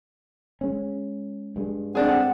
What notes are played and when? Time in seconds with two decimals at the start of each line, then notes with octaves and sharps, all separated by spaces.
0.61 G#3 C#4
1.56 G2 G#3
1.95 A3 C4 D4 G#4 F#5